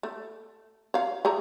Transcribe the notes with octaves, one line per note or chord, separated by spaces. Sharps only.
A3
C#5 F5
A3 G#4 A#5